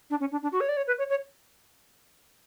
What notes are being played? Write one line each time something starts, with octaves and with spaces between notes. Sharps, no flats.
D4
C#4
D4
D4
F#4
C#5
D5
C#5
B4
C#5
C#5